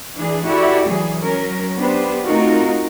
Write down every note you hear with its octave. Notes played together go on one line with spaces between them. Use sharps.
E3 D4 G#4
E4 F#4 G4 A4 D5
E3 F#3 G#4
F#3 C#4 A#4
B3 D4 G4 B4 C5
A3 C4 D#4 F4 F#4 A#4